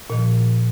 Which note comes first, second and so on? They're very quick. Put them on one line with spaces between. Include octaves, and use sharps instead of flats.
A#2 D#3 F3